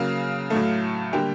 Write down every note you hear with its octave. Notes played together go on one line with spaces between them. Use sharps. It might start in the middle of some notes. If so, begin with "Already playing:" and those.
Already playing: C#3 F#3 A#3 F5
A2 F#3 A3
D3 G3 A#3 G5